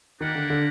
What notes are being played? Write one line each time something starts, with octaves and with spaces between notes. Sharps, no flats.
D#3 A#3 D4 G4 A#4 F#5
D3
D3